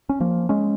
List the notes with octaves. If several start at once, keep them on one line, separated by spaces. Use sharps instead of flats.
C#4
F3 A#3
G#3 C#4